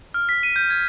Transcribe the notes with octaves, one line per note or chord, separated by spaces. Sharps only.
F6
B6
D#7
G6
G#6